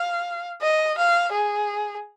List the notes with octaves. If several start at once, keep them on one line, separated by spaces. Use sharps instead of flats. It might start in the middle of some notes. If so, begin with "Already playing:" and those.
Already playing: F5
D#5
F5
G#4